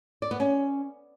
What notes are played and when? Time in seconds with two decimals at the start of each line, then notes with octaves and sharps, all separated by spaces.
0.22 D5
0.31 B3
0.40 C#4